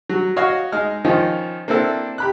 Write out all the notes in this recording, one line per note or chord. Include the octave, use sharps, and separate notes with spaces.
F#3
F#4 C#5 D#5 F5
G#3 D#4 F6
D#3 F3 C#4 D#4 F4
A#3 C4 D4 E4 A4
G4 B5 F#6